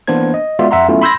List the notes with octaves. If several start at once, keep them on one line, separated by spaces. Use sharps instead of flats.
E3 A#3 B3 D4 C5 G#6
D#5
G#3 B3 F4 F#4 D5 E5
F2 E5 F#5 A#5 C6
F#3 A3 B3 C#4 E4 F4
B5 C6 E6 G6 G#6 A#6